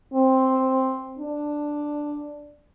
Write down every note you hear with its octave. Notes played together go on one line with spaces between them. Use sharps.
C4
D4